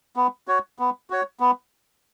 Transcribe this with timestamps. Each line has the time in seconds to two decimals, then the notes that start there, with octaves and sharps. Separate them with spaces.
0.16 B3
0.48 F#4 C#5
0.79 B3
1.10 F#4 C#5
1.40 B3